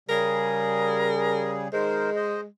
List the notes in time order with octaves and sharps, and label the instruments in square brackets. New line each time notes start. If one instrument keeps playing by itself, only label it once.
[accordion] C#3 G3 G#4 [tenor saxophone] A#4
[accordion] D#3 A#4 C5 [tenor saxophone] G#3
[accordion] C5 D#5